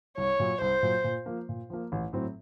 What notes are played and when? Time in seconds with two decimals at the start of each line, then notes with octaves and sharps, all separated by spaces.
0.17 C2 C#5
0.39 A#2 F#3
0.61 C2 C5
0.83 A#2 F#3
1.04 A#2
1.26 F3 A#3
1.49 A#2
1.70 F3 A#3
1.92 A1
2.13 A2 F#3 C4